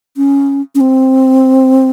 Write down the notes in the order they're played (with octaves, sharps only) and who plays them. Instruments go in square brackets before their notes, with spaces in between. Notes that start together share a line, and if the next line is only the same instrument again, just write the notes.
[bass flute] C#4
C#4
C4